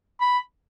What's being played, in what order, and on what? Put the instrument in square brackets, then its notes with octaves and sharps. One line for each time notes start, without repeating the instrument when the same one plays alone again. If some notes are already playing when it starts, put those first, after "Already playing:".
[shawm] B5